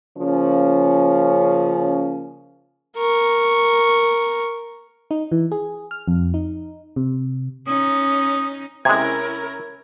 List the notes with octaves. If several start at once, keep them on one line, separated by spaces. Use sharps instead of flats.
C#3 F3 A#3 C#4
A#4 C#6
D#4
E3
G#4
F6
F2
D#4
C3
C#4 D#4 D#6
C3 G#3 C#4 E4 A#4 G#6